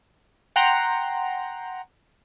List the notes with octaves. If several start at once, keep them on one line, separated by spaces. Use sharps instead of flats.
F#5 G5 A#5 C6